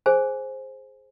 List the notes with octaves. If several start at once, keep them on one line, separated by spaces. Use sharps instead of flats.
G#4 C5 G#5